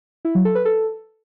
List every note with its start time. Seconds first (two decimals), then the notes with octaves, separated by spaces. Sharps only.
0.25 E4
0.35 F#3
0.45 A4
0.55 B4
0.65 A4